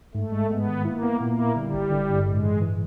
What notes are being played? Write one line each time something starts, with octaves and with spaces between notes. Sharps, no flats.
G#2 A3
G#3
G#3 B3
D#3
A#3 E4
B3
A#2 A#3
E4
D3 G3
G#1
D3
G2
A2 G#3
E3
E3